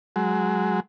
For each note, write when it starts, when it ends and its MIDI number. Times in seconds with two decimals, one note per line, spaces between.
0.16 0.80 54
0.16 0.80 56